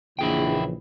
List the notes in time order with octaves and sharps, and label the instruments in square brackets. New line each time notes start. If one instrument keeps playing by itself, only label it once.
[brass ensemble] A#1 C#3 E3 [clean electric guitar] E4 G#4 G5